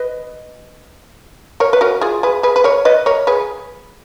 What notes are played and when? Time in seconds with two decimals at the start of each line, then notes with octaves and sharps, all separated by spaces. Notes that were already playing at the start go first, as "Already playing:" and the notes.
Already playing: B4 D#5
1.60 A#4 C#5
1.73 B4
1.81 F#4 A#4
2.01 F4 G#4
2.23 G#4 B4
2.43 G#4 B4
2.56 B4
2.64 A#4 C#5
2.85 B4 D#5
3.06 A#4 C#5
3.27 G#4 B4